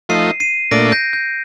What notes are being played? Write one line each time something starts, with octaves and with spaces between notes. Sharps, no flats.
F3 A3 D#4 C7 D#7
C7 D#7
A#2 A3 D4 A#6 D7
G6 A#6
G6